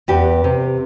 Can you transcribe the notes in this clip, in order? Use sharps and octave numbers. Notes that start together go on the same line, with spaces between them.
E2 G4 B4
C3